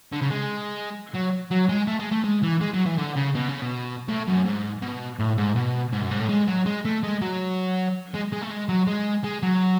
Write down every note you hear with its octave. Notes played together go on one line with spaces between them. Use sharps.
D3
C#3
G#3
F#3
F#3
G#3
A3
G#3
A3
G#3
E3
G#3
F#3
E3
D3
C#3
B2
C#3
B2
A2
F#2
G#2
B2
A2
G#2
B2
G#2
F#2
G#2
A2
G#3
F#3
G#3
A3
G#3
F#3
G#3
G#3
A3
G#3
F#3
G#3
G#3
F#3